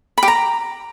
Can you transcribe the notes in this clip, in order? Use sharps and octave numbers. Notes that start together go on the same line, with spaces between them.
B5
G4
A#5